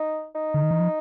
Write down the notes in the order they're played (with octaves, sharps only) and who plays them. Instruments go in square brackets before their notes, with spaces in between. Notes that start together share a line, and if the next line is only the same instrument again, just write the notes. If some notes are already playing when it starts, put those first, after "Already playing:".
Already playing: [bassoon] D#4
D#4
[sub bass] D3
D#3
E3
F3